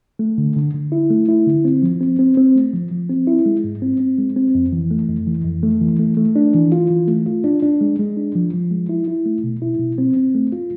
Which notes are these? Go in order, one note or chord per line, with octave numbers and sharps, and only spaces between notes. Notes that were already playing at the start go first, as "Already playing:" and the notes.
A3
D3
D3
D3
E4
A3
E4
D3
C4
F3
C4
C4
C4
A3
F3
F3
C4
E4
G#3
G#2
C4
C4
G#3
C4
F2
E3
A3
F2
E3
F2
A3
E3
A3
A3
D4
E3
F4
E3
A3
F4
D4
D4
G#3
G#3
D4
F3
F3
G#3
E4
E4
A3
B2
E4
B2
C4
C4
A3
F4